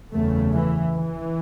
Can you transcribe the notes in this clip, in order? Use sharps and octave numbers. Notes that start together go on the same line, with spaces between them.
F#1 E2 C#3 A3
E3
E3